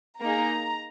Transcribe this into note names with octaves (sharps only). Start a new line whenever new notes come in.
A#3 D#4 G#4 A#5